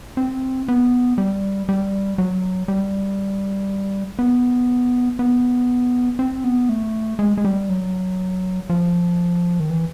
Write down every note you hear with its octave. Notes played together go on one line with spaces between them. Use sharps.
C4
B3
G3
G3
F#3
G3
B3
B3
C4
B3
A3
G#3
G#3
G3
F#3
F3
D#3
E3